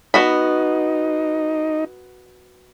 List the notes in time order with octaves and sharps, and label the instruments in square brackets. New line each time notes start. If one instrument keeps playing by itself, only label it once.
[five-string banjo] B3 F#4 B5 [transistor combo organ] D#4